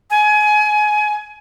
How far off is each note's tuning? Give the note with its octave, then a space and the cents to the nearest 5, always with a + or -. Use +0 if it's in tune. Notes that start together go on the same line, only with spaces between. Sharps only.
G#5 +25